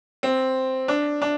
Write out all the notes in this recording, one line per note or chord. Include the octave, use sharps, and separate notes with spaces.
C4
D4
D4